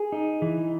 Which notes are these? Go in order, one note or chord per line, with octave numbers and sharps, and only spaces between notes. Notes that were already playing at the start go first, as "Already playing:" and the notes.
Already playing: G#4
D#4
E3